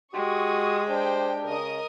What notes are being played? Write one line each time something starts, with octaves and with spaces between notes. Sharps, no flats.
G#3 F#4 G4 C6 C#6 D#6
D4 G4 C5 G5
C#3 A#4 D#5 D#6